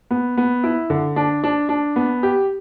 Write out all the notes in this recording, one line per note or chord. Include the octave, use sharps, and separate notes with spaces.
B3
B3
E4
D3
D4
D4
D4
B3
G4